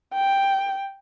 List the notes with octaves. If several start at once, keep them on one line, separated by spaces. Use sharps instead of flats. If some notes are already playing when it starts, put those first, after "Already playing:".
G5